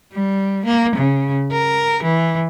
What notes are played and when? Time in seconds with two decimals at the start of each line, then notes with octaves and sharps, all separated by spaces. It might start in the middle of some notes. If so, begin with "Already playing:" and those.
0.12 G3
0.65 A#3
0.96 C#3
1.51 A#4
2.03 E3